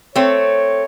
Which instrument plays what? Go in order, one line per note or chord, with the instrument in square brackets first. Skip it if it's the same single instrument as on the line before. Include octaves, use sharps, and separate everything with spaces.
[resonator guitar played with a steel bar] A3 C4 [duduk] C#5